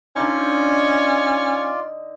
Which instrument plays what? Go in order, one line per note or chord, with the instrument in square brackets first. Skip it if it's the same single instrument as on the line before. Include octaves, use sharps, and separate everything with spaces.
[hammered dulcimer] D3 D#4 [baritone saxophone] C#4 [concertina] F4 D5